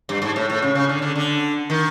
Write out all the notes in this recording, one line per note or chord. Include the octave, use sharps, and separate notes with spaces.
G2
G#2
A2
A2
C#3
C#3
D3
D3
D3
D#3